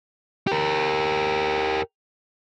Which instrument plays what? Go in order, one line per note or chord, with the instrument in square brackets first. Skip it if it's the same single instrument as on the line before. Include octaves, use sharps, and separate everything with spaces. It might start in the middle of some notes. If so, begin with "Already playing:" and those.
[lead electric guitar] G4 A#4